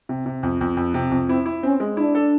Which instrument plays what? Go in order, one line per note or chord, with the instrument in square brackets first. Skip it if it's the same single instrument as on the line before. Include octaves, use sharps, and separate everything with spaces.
[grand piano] C3
C3
F2
F2
F2
C3
F2
[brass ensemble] C4 [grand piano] E4
[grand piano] E4
[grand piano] C4 [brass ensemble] C#4
[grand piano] G#3
[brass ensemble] D4 [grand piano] E4
[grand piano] A4